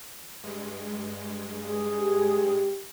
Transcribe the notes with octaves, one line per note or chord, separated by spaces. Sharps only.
G2 G#3
G#4
G4